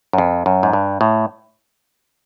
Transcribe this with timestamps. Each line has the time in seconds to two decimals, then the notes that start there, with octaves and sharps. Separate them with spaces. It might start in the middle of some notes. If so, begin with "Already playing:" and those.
0.13 F#2
0.18 F2
0.46 F#2
0.63 G#2
0.73 G2
1.01 A2